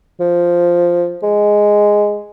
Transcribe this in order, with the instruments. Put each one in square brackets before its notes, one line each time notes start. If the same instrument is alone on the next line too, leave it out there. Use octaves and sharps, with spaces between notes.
[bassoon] F3
G#3